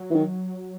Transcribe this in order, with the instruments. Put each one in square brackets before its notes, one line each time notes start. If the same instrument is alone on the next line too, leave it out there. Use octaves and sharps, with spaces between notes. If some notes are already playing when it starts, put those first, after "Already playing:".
Already playing: [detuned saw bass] F#3
[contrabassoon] E3
D#3